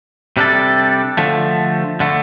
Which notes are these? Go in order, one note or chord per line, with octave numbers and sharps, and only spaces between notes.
C3 G3 D4 A4
D3 F3 A3
D3 A3